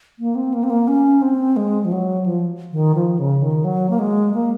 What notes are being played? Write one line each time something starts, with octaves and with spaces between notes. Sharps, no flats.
A#3
C4
A#3
C4
A#3
C#4
C4
G#3
F3
F#3
F3
D#3
F3
C#3
D#3
F#3
A#3
G#3
A#3